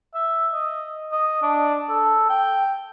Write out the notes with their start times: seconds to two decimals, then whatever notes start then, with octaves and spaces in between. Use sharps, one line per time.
0.14 E5
0.53 D#5
1.12 D#5
1.42 D4
1.89 A4
2.29 G5